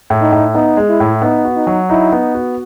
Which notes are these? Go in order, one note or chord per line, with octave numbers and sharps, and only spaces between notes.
A2
D#4
A2
B3 D#4
G#3
E4
A2
B3 D#4
F#4
D#4
F#3
D#4 E4
B3
F#4